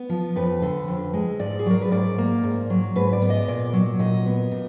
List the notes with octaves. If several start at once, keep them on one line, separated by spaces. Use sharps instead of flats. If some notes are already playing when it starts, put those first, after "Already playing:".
Already playing: B3
F3
F2 B4
D3
F2
G#3
G#2 D5
G#4
F#3 A#4
B4
G#2 D5
A#3
G#2
F#3
G#2 B4
D5
B3
D#5
A#2 D5
F#3
A#2 D#5
B3
A#2